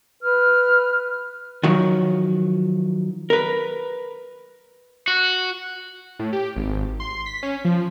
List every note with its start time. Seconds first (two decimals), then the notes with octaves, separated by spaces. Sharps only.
0.23 B4 F6
1.63 D#3 F3 F#3
3.30 A#4 B4
5.08 F#4
6.19 A2
6.33 G4
6.56 G#1
7.00 C6
7.26 B6
7.43 C#4
7.65 F3